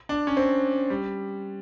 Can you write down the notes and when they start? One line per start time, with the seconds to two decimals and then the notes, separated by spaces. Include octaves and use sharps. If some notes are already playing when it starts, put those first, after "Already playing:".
0.09 D4
0.27 C#4
0.37 C4
0.90 G3